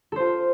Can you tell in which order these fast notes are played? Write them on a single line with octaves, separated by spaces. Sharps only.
A4 C5 F4